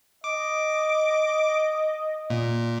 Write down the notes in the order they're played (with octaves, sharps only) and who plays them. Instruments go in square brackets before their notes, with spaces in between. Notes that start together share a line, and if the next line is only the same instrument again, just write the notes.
[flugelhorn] D#5 [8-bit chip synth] D6
[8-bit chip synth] A#2